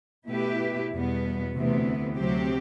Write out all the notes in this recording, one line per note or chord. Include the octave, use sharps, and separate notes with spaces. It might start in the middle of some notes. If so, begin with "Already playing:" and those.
B2 A3 E4 G4 B4
E2 B2 G3 B3
D2 C3 E3 B3
D2 C3 F#3 C4 G4